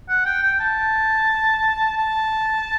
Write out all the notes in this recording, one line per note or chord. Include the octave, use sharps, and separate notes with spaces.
F#5
G5
G5
A5
A5